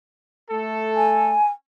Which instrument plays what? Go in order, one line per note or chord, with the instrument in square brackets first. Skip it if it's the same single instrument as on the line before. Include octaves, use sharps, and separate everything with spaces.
[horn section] A3 A4
[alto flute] G#5